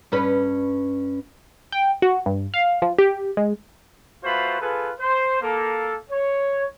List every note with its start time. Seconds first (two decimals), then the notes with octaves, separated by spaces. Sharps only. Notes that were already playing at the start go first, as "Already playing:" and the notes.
0.12 G2 C#4 B4
1.72 G5
2.02 F#4
2.26 G2
2.54 F5
2.82 F3
2.99 G4
3.37 G#3
4.24 A3 F4 F#4 B4 C5 B5
4.61 F4 G#4 A4 B4
4.99 C5
5.42 A#3 A4
6.10 C#5